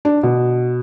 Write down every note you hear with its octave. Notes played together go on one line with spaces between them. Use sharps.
D4
B2